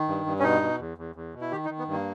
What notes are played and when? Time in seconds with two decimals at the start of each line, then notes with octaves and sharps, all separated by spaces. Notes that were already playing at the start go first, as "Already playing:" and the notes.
Already playing: D#3
0.08 G2
0.26 G2
0.39 C#4
0.43 B2 D#4
0.61 B2
0.79 E2
0.98 E2
1.16 E2
1.34 B2
1.41 E4
1.52 D#3 G4
1.65 D#4
1.70 D#3
1.78 B3
1.88 G2
1.93 A#3